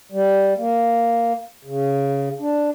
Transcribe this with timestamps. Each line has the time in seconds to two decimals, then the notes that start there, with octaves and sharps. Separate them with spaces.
0.12 G3
0.58 A#3
1.65 C#3
2.40 D4